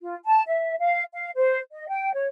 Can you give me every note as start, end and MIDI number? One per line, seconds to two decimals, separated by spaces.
0.01 0.16 65
0.26 0.42 81
0.47 0.75 76
0.79 1.04 77
1.13 1.31 77
1.35 1.58 72
1.72 1.85 75
1.88 2.13 79
2.14 2.28 73